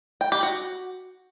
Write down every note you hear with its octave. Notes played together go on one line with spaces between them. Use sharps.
G5
G4
F#4